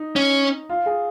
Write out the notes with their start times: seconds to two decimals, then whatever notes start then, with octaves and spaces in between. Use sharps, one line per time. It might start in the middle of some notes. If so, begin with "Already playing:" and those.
Already playing: D#4
0.16 C#4
0.69 F4
0.86 G#4